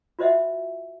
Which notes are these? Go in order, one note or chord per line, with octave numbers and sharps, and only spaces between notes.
F4 F#4 C5 D#5 E5 F#5